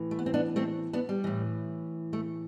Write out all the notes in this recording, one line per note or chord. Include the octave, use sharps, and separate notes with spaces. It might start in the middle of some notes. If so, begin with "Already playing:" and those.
Already playing: A2 E3
A3
B3
C4
B3 D4
A3 C4
B3 D4
G3
A2 E3
A3